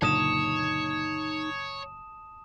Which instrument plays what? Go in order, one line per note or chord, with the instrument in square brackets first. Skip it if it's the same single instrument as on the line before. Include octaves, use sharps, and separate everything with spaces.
[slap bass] F#1 A#2 D3 [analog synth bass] D#4 [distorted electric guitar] C#5 [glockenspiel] A5 D#6 E7